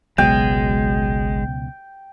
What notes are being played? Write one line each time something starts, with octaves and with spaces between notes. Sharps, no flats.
G#1 C#2 B2 F#3 G#3 G5